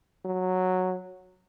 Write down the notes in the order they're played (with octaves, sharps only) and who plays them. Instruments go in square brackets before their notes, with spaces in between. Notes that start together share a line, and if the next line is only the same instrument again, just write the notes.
[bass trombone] F#3